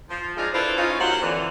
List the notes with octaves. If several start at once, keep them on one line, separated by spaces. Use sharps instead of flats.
F3
G#3 D4 D#4 F4 G#4
D4 E4 F4 A4 B4 C5
C#4 D#4 F4
D#2 F#3 A#3 C5 F#5
F2 D3 E3